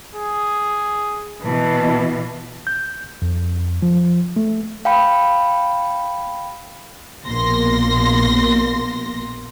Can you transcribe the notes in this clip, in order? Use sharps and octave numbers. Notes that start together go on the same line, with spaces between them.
G#4
B2 E3 A5
G6
F2
F3
A3
F5 G5 B5
A#1 B2 A#3 C6 A#6